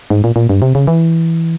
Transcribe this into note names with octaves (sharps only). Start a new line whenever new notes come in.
G#2
A#2
A#2
G2
C3
C#3
E3